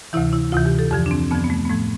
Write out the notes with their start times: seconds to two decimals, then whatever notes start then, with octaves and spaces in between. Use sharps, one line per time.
0.13 D2 C3 E3 E4
0.33 E4
0.52 D2 C3 E3 F4
0.66 G4
0.79 A4
0.91 F2 D3 F3 G4
1.06 D4
1.11 C4
1.31 F2 D3 F3 B3
1.44 B3
1.50 A3
1.65 B3
1.70 A2 F3 A3